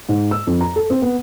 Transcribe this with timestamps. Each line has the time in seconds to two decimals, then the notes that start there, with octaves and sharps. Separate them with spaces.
0.09 G#2
0.31 E6
0.47 F2
0.61 A#5
0.76 A4
0.90 C4
1.02 B3